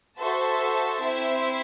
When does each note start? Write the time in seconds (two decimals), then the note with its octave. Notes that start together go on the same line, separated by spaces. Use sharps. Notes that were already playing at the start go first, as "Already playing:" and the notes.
0.20 F#4 A4 C5 E5 A5
1.02 C4 E4 C5 E5